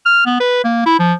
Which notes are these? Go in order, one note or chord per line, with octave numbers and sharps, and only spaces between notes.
F6
B3
B4
A#3
E4
F3